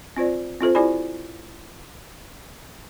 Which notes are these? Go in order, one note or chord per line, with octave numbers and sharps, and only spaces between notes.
C4 F4 C5 D5
C4 F4 A4 C5
E4 G4 C5 D5 G#5 B5